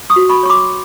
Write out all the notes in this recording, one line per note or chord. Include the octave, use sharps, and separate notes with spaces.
C#6 D#6
F#4
B5 C#6
C#5 C#6
C6 D6